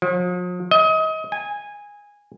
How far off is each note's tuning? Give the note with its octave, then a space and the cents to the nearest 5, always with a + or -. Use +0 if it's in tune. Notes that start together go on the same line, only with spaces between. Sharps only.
F3 +45
D#5 +30
G#5 -15